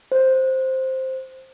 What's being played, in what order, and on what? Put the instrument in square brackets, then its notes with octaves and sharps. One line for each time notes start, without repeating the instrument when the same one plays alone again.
[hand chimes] C5